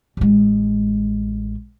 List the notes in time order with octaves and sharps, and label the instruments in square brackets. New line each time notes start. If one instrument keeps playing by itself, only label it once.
[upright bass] A1 G#3